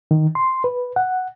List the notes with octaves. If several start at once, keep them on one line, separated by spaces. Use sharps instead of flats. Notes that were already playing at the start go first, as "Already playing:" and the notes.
D#3
C6
B4
F#5